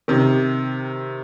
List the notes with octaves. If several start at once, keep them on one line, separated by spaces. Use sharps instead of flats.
C3 D#3